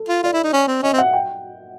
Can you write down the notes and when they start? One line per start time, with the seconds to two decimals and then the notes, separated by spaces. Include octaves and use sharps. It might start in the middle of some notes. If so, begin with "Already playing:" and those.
Already playing: A4
0.09 F4
0.23 F4 D5
0.33 E4
0.43 D#4
0.53 C#4
0.67 C4
0.82 C#4 D#5
0.93 C4
0.98 F#5
1.13 G5